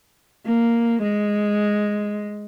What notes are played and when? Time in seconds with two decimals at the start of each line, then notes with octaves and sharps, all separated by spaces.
0.46 A#3
1.03 G#3